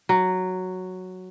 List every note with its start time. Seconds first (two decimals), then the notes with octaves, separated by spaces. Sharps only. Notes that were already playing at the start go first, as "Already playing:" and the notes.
0.09 F#3